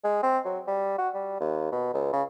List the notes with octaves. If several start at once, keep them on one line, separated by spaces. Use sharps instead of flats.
G#3
C4
F#3
G3
F#4
G3
D#2
B2
C#2
C#3